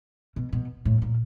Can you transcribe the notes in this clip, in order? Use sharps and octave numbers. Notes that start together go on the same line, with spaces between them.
B2
B2
A2
A#2